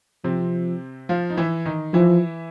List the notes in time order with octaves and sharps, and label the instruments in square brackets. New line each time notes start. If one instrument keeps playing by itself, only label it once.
[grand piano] C3 C4 [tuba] F3
[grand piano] F3 F4
D#4
E3 E4
D#3 D#4
[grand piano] E3 E4 [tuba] F3